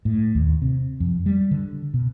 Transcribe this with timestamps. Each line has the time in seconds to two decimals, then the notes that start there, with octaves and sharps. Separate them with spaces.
0.05 A2
0.35 D#2
0.62 C3
1.00 F2
1.26 G3
1.51 D3
1.94 B2